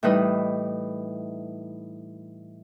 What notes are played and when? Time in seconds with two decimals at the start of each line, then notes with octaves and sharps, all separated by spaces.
0.03 A2 E3 G3 D#4 B4 D#6